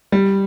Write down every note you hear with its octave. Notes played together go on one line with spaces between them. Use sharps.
G3